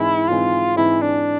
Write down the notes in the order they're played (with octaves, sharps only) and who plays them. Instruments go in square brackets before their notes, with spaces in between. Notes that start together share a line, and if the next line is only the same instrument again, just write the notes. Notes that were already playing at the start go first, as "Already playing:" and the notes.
Already playing: [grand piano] G#2 E3 G#3 C4 [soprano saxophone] E4
[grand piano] G#2 E3 G#3 C4 [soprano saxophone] F4
[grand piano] G#2 E3 G#3 C4 [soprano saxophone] E4
[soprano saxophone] D4